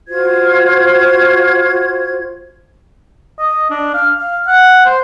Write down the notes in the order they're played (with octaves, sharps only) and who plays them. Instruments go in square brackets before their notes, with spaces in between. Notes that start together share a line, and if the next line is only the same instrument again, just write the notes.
[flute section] F4 F#4 C5 G#6
[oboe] D#5
D4
F5
F5
F#5
C5